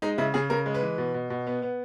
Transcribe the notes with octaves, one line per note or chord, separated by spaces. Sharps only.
G#3 D#4
C#3 E4
C#3 G#4
C#3 A#4
G#3
B4
E3
B2
B2
B2
B3
B3